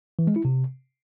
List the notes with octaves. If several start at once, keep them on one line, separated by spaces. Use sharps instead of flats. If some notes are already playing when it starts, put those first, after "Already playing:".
E3
G#3
E4
C3